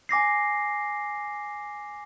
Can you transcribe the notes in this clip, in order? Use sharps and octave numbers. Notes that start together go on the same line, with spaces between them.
G#5 D6 A#6 C7